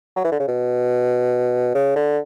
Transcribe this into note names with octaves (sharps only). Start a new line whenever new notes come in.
F#3
E3
D3
C#3
B2
C#3
D3